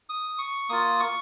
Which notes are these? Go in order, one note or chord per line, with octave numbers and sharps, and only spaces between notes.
D#6
C#6
A#3 F4 D#6
C#6